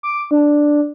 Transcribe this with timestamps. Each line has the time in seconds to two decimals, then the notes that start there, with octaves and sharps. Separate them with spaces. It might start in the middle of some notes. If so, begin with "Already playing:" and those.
0.03 D6
0.31 D4